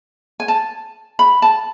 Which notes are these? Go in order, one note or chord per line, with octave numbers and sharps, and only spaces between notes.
G#5
A5
B5
A5